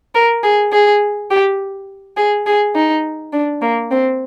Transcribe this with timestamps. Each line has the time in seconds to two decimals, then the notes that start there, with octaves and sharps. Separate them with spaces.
0.15 A#4
0.43 G#4
0.73 G#4
1.31 G4
2.17 G#4
2.46 G#4
2.75 D#4
3.33 D4
3.62 A#3
3.91 C4